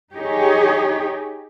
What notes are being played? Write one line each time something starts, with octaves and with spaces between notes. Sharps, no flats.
D#4 G4 G#4 C#5